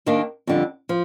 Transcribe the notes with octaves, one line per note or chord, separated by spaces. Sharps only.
D#2 D#3 A#3 D4
F2 D3 G3
F3